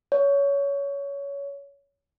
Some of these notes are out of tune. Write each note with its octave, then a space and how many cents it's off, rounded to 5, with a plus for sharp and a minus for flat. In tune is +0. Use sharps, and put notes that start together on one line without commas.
C#5 +20